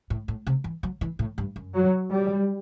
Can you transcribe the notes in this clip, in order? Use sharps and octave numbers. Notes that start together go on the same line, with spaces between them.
A2
A2
C3
E3
F#3
E3
A2
G2
F#2
F#3
G3